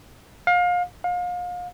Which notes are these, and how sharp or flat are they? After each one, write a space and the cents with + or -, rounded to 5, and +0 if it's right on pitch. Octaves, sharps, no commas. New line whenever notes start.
F5 +30
F5 +35